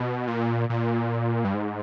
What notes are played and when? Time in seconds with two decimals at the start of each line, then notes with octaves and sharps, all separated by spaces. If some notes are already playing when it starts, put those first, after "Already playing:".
Already playing: B2
0.27 A#2
0.69 A#2
1.44 G2
1.54 G#2